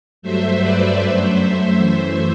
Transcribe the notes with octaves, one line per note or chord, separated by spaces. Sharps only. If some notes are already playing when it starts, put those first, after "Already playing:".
G2 F#3 A3 C5 E5
B4 D5
F#2 F#3 A3 C5 E5
F#2 E3 A3 C5 E5